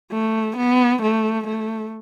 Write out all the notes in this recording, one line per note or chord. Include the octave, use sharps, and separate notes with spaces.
A3
B3
A3
A3